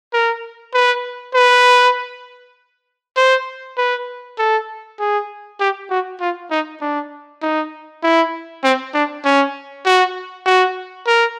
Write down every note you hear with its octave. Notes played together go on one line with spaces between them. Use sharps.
A#4
B4
B4
C5
B4
A4
G#4
G4
F#4
F4
D#4
D4
D#4
E4
C4
D4
C#4
F#4
F#4
A#4